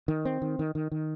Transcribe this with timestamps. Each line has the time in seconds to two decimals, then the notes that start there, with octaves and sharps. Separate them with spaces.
0.08 D#3
0.25 C4
0.42 D#3
0.59 D#3
0.75 D#3
0.92 D#3